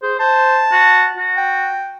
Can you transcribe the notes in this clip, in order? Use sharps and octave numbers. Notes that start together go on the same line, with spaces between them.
G#4 C5
C5 A5
F#4
F#4
G5